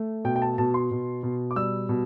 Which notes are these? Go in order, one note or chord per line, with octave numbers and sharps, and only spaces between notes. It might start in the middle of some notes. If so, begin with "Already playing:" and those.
Already playing: A3
B2 G5
G5
A5
B2 A5
C6
B2
B2
D6
G3 E6
B2